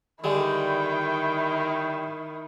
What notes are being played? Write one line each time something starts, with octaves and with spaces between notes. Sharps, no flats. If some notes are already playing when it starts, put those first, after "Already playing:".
D3 D#3 G3 G#3 E4 G5